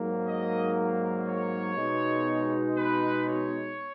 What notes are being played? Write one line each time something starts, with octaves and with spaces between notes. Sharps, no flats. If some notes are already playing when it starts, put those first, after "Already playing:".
Already playing: G#2 F#3 A#3
D#5
C#5
B2 G#3 D#4
B4
C#5